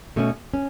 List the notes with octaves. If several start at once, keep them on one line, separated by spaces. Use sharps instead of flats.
B2 A3 C#4
C#4